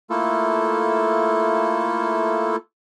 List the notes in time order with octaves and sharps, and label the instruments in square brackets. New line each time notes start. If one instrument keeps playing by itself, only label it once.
[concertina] A3 A#3 E4 F4 A4